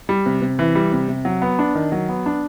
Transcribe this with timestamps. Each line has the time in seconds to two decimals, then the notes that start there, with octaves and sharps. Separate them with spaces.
0.09 G3
0.26 C3
0.42 C3
0.59 E3
0.75 G3
0.92 C3
1.08 C3
1.25 F#3
1.42 B3
1.59 D4
1.75 D#3
1.92 F#3
2.09 B3
2.26 D4